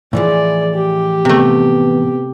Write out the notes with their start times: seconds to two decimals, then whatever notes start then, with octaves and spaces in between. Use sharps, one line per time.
0.13 A2 E3 F3 G#4 D5
0.74 G4
1.25 C3 A3 B3